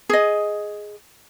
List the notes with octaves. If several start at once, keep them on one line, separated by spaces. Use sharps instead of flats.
G#4 D#5